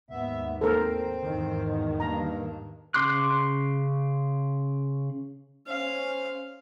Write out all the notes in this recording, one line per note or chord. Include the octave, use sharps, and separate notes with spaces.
D#2 G#2 B3 E5
C4 A4 A#4 C5
E2 G#2 D#3
B2
G2 A#3 D4 A#5
C#3 C6 D6 F#6
C#4 C5 F5